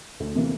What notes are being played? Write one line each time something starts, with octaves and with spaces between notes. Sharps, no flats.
D2
C3 E3 A#3